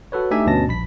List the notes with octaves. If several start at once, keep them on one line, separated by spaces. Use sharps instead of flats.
F#4 A4 B4 C#5
A3 D4 D#4 G4 E5 G#5
D2 G2 B2 C#4 A5 A#6
A#1 B5 B6